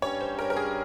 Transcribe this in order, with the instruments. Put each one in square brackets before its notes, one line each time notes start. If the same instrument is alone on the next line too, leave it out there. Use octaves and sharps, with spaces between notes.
[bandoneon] G2 G3 C#4 [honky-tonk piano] C#5
[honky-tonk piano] C5
A#4
A#4
G#4